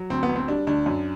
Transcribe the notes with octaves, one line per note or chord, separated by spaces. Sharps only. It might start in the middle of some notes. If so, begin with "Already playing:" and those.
Already playing: F#3
D2 C4
B3
D2
C4
G3 D4
D2 D4
F#2